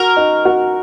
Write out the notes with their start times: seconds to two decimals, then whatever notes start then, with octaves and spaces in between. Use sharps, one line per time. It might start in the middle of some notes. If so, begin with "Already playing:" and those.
Already playing: F#4 A#4
0.17 D#4
0.45 F#4